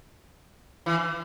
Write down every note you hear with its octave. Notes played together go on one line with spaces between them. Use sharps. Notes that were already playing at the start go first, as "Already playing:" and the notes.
E3